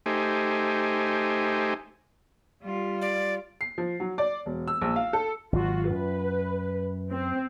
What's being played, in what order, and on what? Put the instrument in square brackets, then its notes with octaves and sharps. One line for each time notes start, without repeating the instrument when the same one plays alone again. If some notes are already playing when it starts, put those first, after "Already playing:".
[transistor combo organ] A3 D#4 G4 C5 G#5
[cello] G3 F4
[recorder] D5
[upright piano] C7
F3
F#3
D5
E1
E6
A#1
F5
A4
[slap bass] G#1 F#3 [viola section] F4 F#4
[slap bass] F#2 [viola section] B4
[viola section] C4